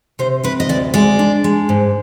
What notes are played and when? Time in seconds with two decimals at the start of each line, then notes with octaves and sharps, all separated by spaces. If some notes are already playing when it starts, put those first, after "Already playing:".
0.19 C3 C5
0.44 C3 B4
0.60 D#5
0.69 D2 D5
0.94 G#3 D5
1.19 D4
1.44 G#3
1.69 G#2